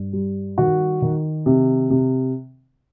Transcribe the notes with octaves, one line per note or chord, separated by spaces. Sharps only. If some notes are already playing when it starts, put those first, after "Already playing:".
Already playing: G2
G3
D#3 F#4
D#3
C3
C3